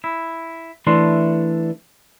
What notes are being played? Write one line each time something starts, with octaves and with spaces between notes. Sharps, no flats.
E4
E3 A3 D4 C6